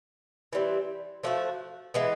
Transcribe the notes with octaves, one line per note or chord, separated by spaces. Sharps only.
E3 G3 C4
F3 A3 D4 F#4
E3 G#3 B3